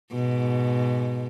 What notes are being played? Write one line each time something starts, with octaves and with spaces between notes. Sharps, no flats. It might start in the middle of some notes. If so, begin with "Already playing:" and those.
G#2 B2